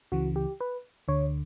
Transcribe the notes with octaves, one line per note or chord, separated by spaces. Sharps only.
C#2 C#3 E3 F#4
G4
B4
D2 D3 C#5